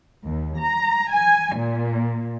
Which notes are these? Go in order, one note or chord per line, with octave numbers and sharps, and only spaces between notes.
D#2
A#5
G#5
A#2